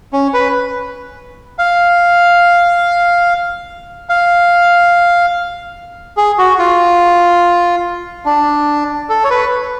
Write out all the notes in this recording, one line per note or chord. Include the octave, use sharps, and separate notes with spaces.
C#4
B4
F5
F5
G#4
F#4
F4
D4
A4
C#5
B4